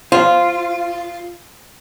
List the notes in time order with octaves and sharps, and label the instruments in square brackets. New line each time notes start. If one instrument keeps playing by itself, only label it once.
[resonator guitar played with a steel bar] F4 [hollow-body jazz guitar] C5 F5